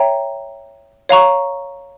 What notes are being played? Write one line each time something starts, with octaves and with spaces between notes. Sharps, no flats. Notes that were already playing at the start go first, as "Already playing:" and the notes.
Already playing: C#5 E5 G5 A#5
C#5 F5 A#5 C#6